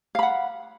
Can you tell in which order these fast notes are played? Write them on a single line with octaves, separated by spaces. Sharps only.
F5 B5 F#5